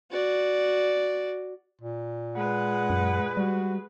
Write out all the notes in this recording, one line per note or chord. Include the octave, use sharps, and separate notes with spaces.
F#4 D5
A#2
G#3 B4 F#5
F#2
G3 F#4